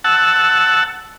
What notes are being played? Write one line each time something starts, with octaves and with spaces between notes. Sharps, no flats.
F#5 A5 E6